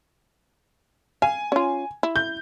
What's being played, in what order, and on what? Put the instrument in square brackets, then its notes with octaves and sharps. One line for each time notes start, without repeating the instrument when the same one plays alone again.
[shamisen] F5 [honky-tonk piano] G#5
[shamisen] C#4 F4
E4
[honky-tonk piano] G6